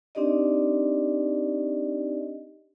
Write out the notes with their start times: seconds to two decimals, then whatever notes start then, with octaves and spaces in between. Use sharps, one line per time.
0.15 C4 D4 D#4 G4 D5 D#5